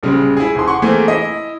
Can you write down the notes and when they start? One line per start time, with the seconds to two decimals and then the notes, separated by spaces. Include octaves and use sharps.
0.03 A#1 C#3 G3 G#3
0.37 E4 G#4
0.55 D#1 C6
0.67 F#5 C6 C#6
0.82 E3 A3 A#3 C4 G#4
1.08 E4 D#5